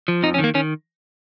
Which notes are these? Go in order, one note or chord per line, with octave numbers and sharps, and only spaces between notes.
F3
F2 D#4
C#4
D#3
A#3
D#3 C#4